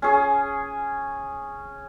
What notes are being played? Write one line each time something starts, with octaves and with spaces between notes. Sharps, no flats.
C#4 G#4